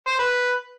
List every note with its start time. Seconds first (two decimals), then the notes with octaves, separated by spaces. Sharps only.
0.07 C5
0.19 B4